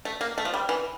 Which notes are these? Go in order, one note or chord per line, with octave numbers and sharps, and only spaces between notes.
A3
A#3
A3
F3
G3
E3